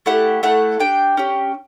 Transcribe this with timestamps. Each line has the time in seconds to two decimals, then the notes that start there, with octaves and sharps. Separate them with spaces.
0.06 A3 E4 G4 F#5
0.43 A3 E4 A4 F#5
0.80 D4 G4 G5
1.17 C#4 G4